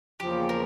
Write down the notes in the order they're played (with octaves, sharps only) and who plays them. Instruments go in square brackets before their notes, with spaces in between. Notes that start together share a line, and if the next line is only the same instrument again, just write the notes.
[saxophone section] E2 C#3 F3 A#3 [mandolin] G4
[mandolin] A#4